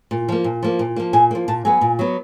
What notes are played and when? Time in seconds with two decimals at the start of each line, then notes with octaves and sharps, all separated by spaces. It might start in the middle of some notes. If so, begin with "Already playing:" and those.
0.11 A#2
0.29 F3 A#3
0.44 A#2
0.63 F3 A#3
0.79 A#2
0.96 F3 A#3
1.13 A#2 G#5
1.31 F3 A#3
1.48 A#2 A5
1.65 F#3 B3 G#5
1.81 A#2
1.99 F#3 B3